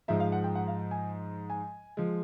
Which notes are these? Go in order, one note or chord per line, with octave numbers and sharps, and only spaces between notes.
G#2 F3 G#3 E5
F5
F#5
G5
F#5
F5
G#5
G#5
F3 G#3